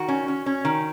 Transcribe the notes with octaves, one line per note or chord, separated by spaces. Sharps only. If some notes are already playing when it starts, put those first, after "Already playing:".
Already playing: D#3 F#4
C#4
C#4
C#4
D#3